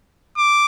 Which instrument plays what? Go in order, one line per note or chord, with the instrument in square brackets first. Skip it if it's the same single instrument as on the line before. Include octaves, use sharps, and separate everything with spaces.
[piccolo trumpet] D6